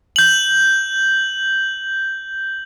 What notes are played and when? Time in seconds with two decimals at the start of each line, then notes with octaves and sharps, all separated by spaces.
0.16 G6 F#7